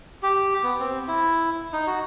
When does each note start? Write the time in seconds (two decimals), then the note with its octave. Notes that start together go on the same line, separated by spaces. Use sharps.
0.23 G4
0.63 B3
0.79 C4
1.08 E4
1.73 D#4
1.87 F#4